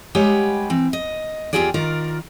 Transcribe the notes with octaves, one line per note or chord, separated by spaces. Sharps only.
G3 G#3 G4 B4 C#5 F#5
E3 C4
D#5
E2 F#3 F4 G4 G#4 D5
D#3 F4 A#4 D5